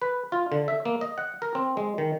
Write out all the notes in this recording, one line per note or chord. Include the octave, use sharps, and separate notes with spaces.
B4
F4
D3
E5
A#3
D#5
F#5
A#4
C4
G#3
D#3